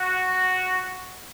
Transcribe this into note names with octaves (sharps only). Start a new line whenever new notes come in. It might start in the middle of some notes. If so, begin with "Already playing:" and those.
Already playing: F#4